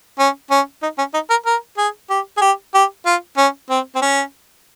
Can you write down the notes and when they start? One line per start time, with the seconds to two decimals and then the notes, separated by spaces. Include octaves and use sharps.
0.19 C#4
0.51 C#4
0.83 D#4
0.98 C#4
1.14 D#4
1.30 A#4
1.46 A#4
1.78 G#4
2.10 G4
2.37 G#4
2.41 G4
2.74 G4
3.06 F4
3.37 C#4
3.70 C4
3.95 C4
4.02 C#4